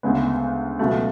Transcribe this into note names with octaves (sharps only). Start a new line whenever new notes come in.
D2 C#3 G#3 B3
C#2 B2 F#3 A3